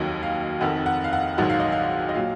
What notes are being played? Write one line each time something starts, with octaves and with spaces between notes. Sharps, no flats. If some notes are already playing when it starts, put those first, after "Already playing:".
Already playing: F1 D#2 D#3 F#3 D#5
F5
F1 F2 D#3 F#5
F#5
F5
F#5
A#1 G#2 D#3 F#3 F#5
F5
D#5
F5
D#5
A#2 F#3 F5